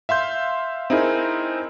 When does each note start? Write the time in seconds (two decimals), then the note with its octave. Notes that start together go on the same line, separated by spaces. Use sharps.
0.09 E5 F5 C6 G6
0.90 C4 D#4 E4 G#4 A#4